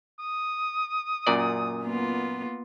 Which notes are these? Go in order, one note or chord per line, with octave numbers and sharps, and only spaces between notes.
D#6
F#2 A#2 D5
A#3 B3 F4